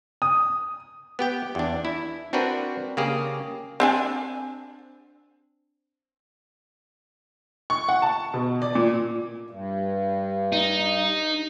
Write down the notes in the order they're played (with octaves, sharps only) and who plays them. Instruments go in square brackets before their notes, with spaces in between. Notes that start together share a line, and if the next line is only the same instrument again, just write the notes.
[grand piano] D#6
[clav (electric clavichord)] B3 G4 G5
E2 D4
E4
C4 D4 F#4 A#4 B4
C#3 A#3 G4 G#4
[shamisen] C4 D4 G#5
[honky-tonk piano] C#6
F#5
A5
B2
D5
A#2
[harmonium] G2
[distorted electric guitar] D#4